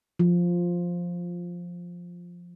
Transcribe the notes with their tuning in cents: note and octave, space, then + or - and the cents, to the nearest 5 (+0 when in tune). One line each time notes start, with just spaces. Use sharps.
F3 +5